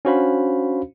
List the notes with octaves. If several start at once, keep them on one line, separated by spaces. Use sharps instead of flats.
C#4 D4 F#4 C5 F5 B5